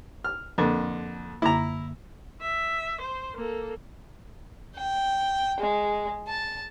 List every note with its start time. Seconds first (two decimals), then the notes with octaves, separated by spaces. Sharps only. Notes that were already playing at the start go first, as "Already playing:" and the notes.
0.24 F6
0.58 F2 D3 A#3 A#4 B4
1.42 F#2 D3 A#3 E4 A#5
2.41 E5
3.01 C5
3.34 A#3 A4
4.76 G5
5.60 G#3
6.28 A5